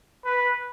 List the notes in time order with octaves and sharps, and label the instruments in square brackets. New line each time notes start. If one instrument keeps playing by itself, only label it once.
[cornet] B4